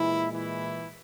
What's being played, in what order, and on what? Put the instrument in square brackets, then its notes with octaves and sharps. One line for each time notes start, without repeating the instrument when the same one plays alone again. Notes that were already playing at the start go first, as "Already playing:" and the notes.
Already playing: [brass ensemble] A#2 E3 G#3 E4
E3 E4